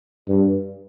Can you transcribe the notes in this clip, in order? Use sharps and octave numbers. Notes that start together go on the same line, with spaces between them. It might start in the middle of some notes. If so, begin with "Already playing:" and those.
G2